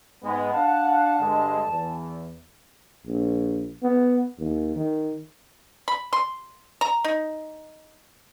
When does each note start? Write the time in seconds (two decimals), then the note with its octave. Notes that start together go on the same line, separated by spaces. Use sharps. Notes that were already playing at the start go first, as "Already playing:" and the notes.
0.23 G#2 G#3 B3
0.53 D4 F5 F#5 A5
1.20 G2 D3 G#3
1.68 E2
3.07 A#1
3.83 B3
4.38 D#2
4.76 D#3
5.88 B5
6.13 C6
6.81 A#5
7.04 D#4